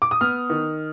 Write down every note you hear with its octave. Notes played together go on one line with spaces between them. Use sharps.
D6
D#6
B3 F6
D#3